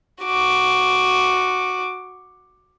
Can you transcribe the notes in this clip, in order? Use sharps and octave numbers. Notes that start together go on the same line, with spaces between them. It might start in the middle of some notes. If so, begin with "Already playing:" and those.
F#4 D6